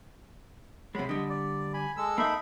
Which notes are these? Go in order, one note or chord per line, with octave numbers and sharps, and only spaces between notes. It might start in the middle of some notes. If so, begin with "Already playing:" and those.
C3 F#3 G#3 B5
D3 G3 D#5
D5
G#5 B5
G#3 A4 E6
A#3 D#4 A4 E5 B5